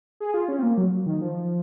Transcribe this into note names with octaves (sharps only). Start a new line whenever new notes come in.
G#4
F4
C#4
C4
A#3
F#3
D#3
F3